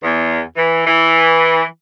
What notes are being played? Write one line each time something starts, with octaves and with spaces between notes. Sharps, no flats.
E2
E3
E3